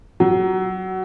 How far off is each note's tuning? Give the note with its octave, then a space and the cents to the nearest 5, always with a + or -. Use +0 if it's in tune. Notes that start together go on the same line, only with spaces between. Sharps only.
F#3 +15